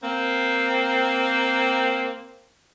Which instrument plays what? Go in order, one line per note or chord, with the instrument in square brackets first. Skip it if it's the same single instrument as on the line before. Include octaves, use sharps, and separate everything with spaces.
[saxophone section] A#3 C4